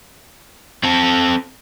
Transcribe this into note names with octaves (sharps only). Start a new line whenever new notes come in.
C4 A4